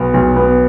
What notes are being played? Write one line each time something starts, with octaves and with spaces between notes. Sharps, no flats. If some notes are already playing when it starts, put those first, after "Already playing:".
Already playing: B1 B3
B1
B3